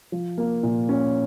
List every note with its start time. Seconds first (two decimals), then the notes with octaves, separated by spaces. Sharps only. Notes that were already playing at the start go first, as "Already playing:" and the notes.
0.12 F3
0.38 A#3
0.63 A#2
0.89 C#4